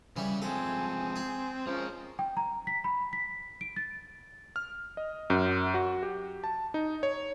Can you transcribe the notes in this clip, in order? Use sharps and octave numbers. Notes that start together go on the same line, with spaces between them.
C#3 E3 G3 C#5
F3 G#3 C4 A4 G#5
G#4
F3 G#3 C#4 A#4 C5
G5
A#5
B6
B5
B6
D7
A6
F6
D#5
F#2
F#4
G4
A5
D#4
C#5